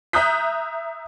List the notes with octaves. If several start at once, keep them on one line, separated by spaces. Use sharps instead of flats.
E5 A#5 D#6 F#6 G6 B6